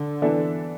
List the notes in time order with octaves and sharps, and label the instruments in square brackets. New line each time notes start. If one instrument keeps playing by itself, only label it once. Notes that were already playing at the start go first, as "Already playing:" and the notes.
Already playing: [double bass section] D3
[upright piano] E3 B3 D4 A4 E5